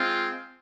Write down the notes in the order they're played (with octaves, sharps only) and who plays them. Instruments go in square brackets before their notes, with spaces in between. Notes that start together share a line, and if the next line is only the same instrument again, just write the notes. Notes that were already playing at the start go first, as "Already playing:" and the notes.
Already playing: [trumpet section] G#3 C4 F4